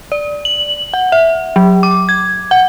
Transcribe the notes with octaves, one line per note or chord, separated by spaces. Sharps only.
D5
F#7
F#5
E5
F#3
D6
G#6
F#5